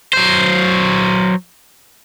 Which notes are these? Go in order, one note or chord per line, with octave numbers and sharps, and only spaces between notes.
F#3 C5